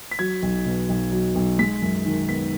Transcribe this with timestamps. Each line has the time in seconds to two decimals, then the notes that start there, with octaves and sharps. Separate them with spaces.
0.11 B6
0.19 F#3 G#6
0.42 B1
0.66 B2
0.89 B1
1.12 F#3
1.35 B1
1.59 G#3 B6
1.82 F#2
2.06 D#3
2.29 B3 B6